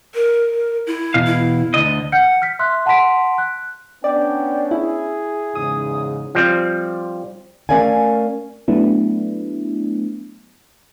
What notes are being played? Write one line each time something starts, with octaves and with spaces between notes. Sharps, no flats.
A#4
E4
E2 B2 F5
E4
D2 D3 D#5
F#5 F6 G6 C#7
F6 B6
E5 C6 F6 F#6
F#5 A5 B5 C6 B6 D7
F#6
B3 C#4 D4 D5 G5
E4 G#4
E2 G#2 C#3 D#6
F3 G3 C4
A3 C#4 A#4 D5 F5 G#5
F#3 A3 B3 D4 E4